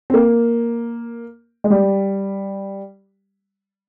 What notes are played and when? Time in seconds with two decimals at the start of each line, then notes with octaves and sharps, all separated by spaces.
0.10 C4
0.14 A#3
1.64 G#3
1.70 G3